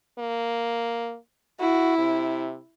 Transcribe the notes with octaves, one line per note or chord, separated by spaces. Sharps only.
A#3
E4 F#4
C3